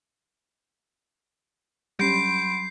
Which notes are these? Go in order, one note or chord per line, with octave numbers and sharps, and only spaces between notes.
F#3 G3 C#4 B5 C6 G6 C7 D7